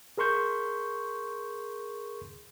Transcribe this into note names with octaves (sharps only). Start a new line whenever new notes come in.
G#4 A#4 C6 C#6 G6